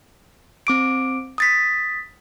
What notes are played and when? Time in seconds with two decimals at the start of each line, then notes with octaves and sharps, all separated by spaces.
0.67 C4 D6 D7
1.38 D#6 A6 B6